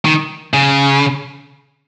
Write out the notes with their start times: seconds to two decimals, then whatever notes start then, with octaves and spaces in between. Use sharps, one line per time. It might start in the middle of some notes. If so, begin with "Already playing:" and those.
0.05 D#3
0.54 C#3